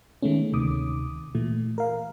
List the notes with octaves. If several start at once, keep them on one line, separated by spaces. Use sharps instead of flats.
D#3 G#3 A3 B3 C#4
D2 C3 D#3 D6 D#6
A#2 E3 A3
A#4 F5